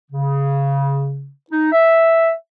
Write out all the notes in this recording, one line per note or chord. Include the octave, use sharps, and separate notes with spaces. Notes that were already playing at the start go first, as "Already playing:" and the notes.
C#3
D#4
E5